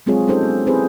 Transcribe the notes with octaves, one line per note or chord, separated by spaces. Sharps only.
F#3 G#3 C4 F4 G#4 C#5
C#4 D#4 G4 A4 C5
B3
C4 E4 G4 G#4 B4 C5